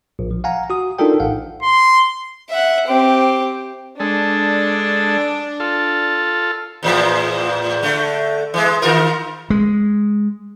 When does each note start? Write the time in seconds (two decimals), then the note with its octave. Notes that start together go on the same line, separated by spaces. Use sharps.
0.19 A#1
0.31 F3
0.44 F5 F#5 G#5 A#5
0.70 F#4 D#6
0.99 D4 D#4 F4 A4 A#4 G5
1.20 A1 F5 F#5
1.62 C6
2.50 E5 F#5
2.87 C4 G4
4.00 G#3 D4 A4
5.60 F4 A4
6.83 E2 A2 F3
7.83 D3 A3
8.54 E3 G#3
8.82 D#3 F4 A#4
9.50 G#3